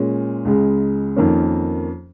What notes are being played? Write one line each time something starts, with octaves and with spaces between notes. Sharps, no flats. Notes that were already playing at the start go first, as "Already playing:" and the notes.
Already playing: A#2 G#3 C#4
C#2 C#3 G#3
F2 D#3 A#3 C#4